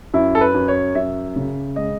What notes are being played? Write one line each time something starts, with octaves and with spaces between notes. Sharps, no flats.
F#2 E4
A4
B4
F#2
C#5
F#2 E5
C#3
G#3 D#5